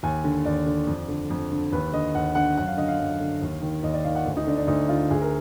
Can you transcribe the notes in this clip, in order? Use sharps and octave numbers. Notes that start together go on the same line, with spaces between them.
D#2 G#5
D3
D#2 D5
D3
F2
D3
F2
D3
D#2 B4
D3 D#5
D#2 F#5
D3 F#5
F#2 F#5
F5
D3 D#5
F5
F#2
D3
D#2
D#3
D#2 D#5
D5
D#3 F5
F#5
D2
D#4
D3 D4
D4
D2 D#4
D3 F4
D2 G#4
A#4